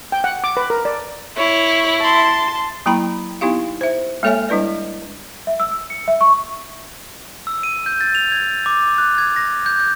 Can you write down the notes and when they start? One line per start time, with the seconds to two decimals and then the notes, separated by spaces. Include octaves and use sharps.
0.12 G5
0.24 F#5
0.44 D6
0.57 B4
0.70 A#4
0.85 D5
1.37 E4 C#5
2.01 A5 C6
2.86 F#3 A#3 E4 G5 A#5 B5
3.41 B3 D#4 E4 G4 F5
3.81 C5 E5
4.23 G#3 A#3 A4 C#5 E5 G#5
4.49 G3 D4 E4 B4 D5
5.47 E5
5.60 E6
5.71 E6
5.90 C#7
6.08 E5
6.21 C#6
7.47 E6
7.63 D#7
7.86 G6
8.01 A6
8.15 F7
8.32 G#6
8.66 D6
8.98 F#6
9.18 G#6
9.36 A#6
9.66 G6
9.80 G6